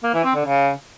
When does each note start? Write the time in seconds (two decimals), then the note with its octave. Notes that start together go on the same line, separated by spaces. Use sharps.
0.04 A#3
0.14 E3
0.24 C4
0.35 D3
0.45 C#3